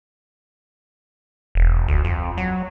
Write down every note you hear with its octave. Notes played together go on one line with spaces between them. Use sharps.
E1
D2
F2
F#3